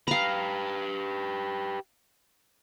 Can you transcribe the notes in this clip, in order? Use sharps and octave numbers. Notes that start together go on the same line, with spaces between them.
G4 B4 F5 A#5